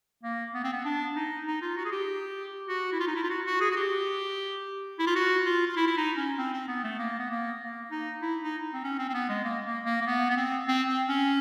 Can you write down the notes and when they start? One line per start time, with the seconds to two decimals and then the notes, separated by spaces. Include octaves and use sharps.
0.23 A#3
0.54 B3
0.64 C4
0.73 B3
0.85 D4
1.16 D#4
1.46 D#4
1.62 F4
1.77 F#4
1.85 G#4
1.92 G4
2.68 F#4
2.92 E4
3.00 F4
3.07 D#4
3.15 E4
3.23 F4
3.30 F#4
3.46 F#4
3.60 G#4
3.71 F#4
3.76 G4
4.99 E4
5.07 F4
5.15 F#4
5.45 F4
5.67 F4
5.76 E4
5.87 E4
5.97 D#4
6.17 C#4
6.38 C4
6.53 C4
6.68 B3
6.84 A3
6.98 A#3
7.19 B3
7.30 A#3
7.60 A#3
7.91 D#4
8.22 E4
8.42 D#4
8.73 C4
8.84 C#4
8.99 C4
9.09 C4
9.14 B3
9.29 G#3
9.44 A#3
9.65 A#3
9.85 A#3
10.01 A#3
10.06 B3
10.30 B3
10.37 C4
10.68 C4
10.88 C4
11.08 C#4